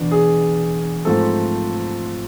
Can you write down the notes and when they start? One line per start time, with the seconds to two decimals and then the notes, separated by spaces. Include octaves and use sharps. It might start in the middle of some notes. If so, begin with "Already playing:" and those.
Already playing: E2 B2 B3 D4
0.11 G#4
1.05 G#2 F3 A3 C4 A4